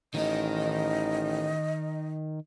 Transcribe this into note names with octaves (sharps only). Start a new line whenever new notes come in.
A1 D#3 D#4 D#5